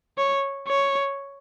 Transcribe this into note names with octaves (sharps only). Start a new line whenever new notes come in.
C#5
C#5